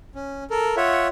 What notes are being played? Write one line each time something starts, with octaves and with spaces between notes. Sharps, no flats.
C#4
A4 A#4
F4 C#5 E5 F#5